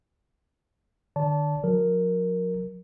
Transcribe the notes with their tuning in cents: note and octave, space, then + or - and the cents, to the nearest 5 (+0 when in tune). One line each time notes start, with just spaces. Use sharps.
D3 +35 D5 -35 A5 +0
F#3 -45 A#4 +0